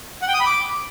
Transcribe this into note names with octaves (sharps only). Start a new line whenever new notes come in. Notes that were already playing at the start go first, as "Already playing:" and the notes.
F#5
G5
D#6
B5
D6